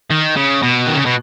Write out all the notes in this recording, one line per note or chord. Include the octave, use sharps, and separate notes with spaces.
D#3
C#3
B2
D#3
C#3
B2